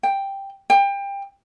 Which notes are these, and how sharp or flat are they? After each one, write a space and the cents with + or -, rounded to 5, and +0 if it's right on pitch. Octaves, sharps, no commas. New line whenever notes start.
G5 +5
G5 +25